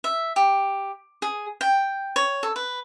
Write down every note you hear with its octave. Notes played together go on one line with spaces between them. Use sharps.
E5
G4
G#4
G5
C#5
A4
B4